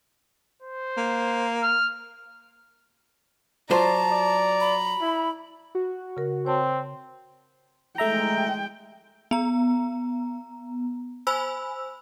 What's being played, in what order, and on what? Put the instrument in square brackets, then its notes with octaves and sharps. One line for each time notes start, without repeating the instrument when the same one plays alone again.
[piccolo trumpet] C5
[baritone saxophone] A#3
[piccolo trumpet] F6
[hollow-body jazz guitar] F#3 F4 C5 [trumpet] D5 [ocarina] A5 [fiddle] A#5
[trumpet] D5
[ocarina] B5
[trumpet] E4
[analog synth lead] F#4
[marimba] C#3 A#4
[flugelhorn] C4 [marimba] C#5 A5
[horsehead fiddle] G#3 G5 [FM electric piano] A3 E5 A#5
[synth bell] B3 A#5
C5 G#5 B5 E6